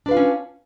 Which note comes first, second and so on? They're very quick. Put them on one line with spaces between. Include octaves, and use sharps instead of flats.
D4 B4 F5 F4 C#4